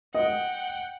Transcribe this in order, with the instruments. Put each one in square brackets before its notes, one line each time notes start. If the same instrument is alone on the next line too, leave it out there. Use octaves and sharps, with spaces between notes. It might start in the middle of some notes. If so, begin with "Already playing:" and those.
[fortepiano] D#5 [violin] F#5 G5